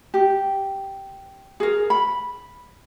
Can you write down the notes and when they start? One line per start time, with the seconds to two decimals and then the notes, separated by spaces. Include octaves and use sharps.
0.14 G4
1.60 G#4 A#4
1.90 B5